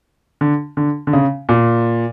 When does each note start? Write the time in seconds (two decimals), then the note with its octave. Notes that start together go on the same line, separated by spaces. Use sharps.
0.41 D3
0.77 D3
1.07 D3
1.13 C#3
1.49 A#2